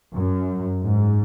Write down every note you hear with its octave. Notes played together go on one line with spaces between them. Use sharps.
F#2
G#2